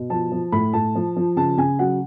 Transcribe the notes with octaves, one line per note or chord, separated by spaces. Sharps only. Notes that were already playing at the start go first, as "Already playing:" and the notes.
Already playing: B2
F3 A5
F3
A2 B5
A2 A5
F3
F3
C#3 A5
C#3 G#5
F#3 F#5